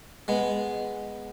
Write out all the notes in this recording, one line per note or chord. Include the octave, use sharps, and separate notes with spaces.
G#3 B3